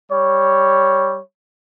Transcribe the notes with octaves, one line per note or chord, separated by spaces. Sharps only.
G3 C#5